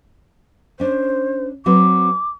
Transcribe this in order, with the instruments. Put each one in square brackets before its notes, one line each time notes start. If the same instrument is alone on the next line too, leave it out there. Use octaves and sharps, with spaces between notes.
[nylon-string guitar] C#4 D4 [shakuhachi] C5
[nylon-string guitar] F#3 C4 B4 [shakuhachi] D6